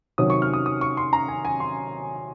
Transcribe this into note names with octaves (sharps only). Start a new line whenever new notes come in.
C3 D#3 F#3 C#4 D#6
C#6
F6
D#6
D#6
C#6
C6
A#5
G#5
G#5
C6